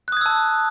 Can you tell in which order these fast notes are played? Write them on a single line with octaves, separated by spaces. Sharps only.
F#6 D#6 G#6 E6 A5